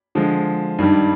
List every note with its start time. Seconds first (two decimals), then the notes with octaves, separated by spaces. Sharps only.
0.15 D3 F3 G#3
0.79 G2 D#3 G3